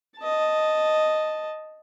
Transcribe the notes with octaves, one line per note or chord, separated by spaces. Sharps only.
D#5 A5